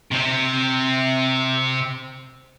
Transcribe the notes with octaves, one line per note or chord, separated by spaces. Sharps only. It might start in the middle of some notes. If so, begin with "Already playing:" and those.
C3 C4